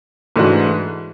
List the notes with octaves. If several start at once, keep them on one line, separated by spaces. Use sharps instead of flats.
G#2 E3 A3 D4 F#4